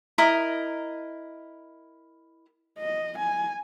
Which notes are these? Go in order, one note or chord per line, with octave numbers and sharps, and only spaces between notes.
E4 A#4 D#5
D#5
G#5